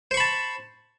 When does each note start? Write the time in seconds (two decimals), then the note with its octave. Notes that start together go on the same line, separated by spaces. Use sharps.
0.11 C5
0.14 C#6
0.17 B5
0.20 A5